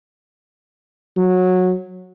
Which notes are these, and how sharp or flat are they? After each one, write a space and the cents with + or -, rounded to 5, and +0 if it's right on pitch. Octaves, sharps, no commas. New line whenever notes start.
F#3 -15